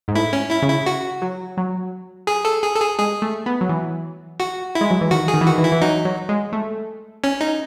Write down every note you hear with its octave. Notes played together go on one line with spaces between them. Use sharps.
G#2
A2 E4
C#4
E4
C#3
E4
F#4
F#3
F#3
G#4
A4
G#4
A4
G#4
G#3 G#4
A3
B3
F#3
E3
F#4
E4
G#3
F#3
E3
D#3 F#4
G#4
D#3
E3
D#3 F#4
E3
E4
E3
F#3 D#4
F#3
G#3
A3
C#4
D#4